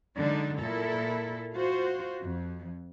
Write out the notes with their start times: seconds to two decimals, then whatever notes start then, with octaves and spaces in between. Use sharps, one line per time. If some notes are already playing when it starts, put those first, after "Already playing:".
0.17 D3 F#3 G#3 D4 D#4
0.59 A#2 E4 A4 A#4
1.54 F4 F#4 C5
2.21 F2